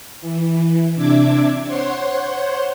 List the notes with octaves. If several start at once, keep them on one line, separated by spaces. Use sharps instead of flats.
E3
C3 D4 E5 D6 G#6
C5 C#5 F#5 C6